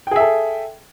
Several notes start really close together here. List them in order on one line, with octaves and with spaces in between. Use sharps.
G5 G#4 E5 A4